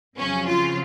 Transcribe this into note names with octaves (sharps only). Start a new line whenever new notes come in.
F2 C#3 F#3 C#4
F4